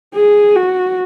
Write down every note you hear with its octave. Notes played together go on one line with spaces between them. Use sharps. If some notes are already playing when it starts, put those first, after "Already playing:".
G#4
F#4